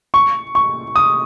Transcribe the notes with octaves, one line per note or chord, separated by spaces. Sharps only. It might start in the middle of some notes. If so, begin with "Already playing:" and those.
C#6
C#6
D#6